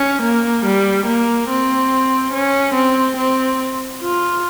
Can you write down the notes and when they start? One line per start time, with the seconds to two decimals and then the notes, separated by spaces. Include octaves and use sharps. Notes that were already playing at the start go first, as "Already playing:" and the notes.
Already playing: C#4
0.22 A#3
0.65 G3
1.07 A#3
1.49 C4
2.33 C#4
2.74 C4
3.17 C4
4.01 F4